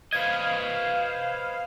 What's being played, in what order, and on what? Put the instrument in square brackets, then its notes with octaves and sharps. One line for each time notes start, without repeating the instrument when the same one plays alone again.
[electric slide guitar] B4 C5 D#5 [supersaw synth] F5 [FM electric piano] G#6